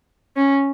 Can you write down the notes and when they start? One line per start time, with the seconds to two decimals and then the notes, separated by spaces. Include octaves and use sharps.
0.37 C#4